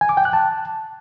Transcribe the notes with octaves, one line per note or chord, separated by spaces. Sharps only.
G#5
D6
G5
F#6
A5